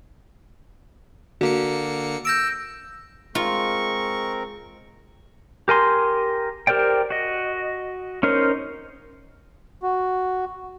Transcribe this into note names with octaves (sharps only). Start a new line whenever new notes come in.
D3 A#3 F#4 C#7
E6 G6 A#6 D7
G#3 C4 F4 A#4 C#6
G4 A#4 G#5 C6
G4 A#4 C5 D5 G5
F#4 D#5
C#4 D#4 A#4 C5
F#4